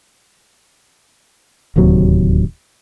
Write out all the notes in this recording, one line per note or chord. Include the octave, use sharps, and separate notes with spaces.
D1 D#2 C3 F#3